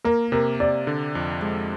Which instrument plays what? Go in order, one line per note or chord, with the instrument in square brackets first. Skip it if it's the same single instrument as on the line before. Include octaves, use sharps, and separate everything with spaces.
[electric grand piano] A#3 [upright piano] A#4
[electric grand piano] C3 [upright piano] A#4
[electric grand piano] C3 [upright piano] D5
[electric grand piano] D3
F2
G#3